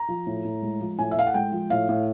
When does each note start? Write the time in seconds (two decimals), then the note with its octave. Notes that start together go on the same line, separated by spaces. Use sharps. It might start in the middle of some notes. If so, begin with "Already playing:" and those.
Already playing: A#5
0.08 F3
0.27 A2
0.45 A2
0.62 G#3
0.80 F3
0.99 A2 G#5
1.11 E5
1.17 A2 F5
1.27 F#5
1.34 G#3 G5
1.52 F3
1.70 A2 F5
1.89 A2